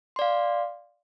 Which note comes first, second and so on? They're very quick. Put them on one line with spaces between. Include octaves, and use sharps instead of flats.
C6 D5 F5